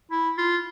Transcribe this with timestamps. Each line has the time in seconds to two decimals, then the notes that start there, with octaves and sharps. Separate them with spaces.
0.11 E4
0.38 F4